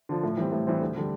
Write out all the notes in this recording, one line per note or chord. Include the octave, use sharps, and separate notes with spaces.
D3 F3
A2
E3 G3 C4
A2
E3 G3 C4
D2
D3 G3